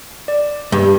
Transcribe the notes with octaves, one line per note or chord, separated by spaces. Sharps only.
D5
G2